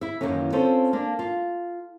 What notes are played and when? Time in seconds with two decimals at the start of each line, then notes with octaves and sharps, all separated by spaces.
0.01 E4 E5
0.21 F#2 A#2 D#3 E3 A#3 C#4
0.52 C4 C#4 F4 A4 C5
0.93 A#3 D4
1.19 F4